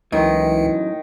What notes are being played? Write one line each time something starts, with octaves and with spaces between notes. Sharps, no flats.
C#2 F#2 A2 D#3 E3